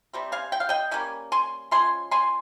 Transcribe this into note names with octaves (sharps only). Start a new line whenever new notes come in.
C3 G3 C4
F5 G#5
G5
F5
D#5 G5
G3 A#3 C#4 G#5
G#5 C6
F3 G#3 C#4 G#5 C6
G#5 C6